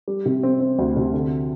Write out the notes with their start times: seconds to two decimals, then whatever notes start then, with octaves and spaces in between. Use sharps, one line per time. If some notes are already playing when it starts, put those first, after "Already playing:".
0.08 G3
0.26 C3
0.43 C4
0.60 C4
0.79 D2
0.96 C3
1.13 D3